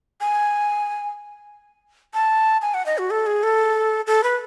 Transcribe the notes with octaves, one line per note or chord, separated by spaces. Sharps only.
G#5
A5
G#5
F#5
D#5
F#4
A4
G#4
A4
A4
B4